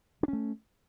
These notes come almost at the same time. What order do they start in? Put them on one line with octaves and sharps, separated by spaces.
D4 C#4 A3